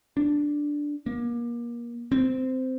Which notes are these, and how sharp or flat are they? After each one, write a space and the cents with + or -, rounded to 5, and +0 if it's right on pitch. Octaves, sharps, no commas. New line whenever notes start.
D4 +0
A#3 +30
C4 -15